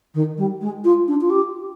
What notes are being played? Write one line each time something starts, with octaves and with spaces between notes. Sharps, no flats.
D#3
G3
G#3
F4
D4
F4
G4